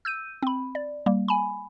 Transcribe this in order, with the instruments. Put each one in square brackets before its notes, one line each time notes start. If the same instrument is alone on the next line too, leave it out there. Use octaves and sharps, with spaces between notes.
[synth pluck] E6 G6 D#7
C4 B5
D5
G3 A#3
G#5 B5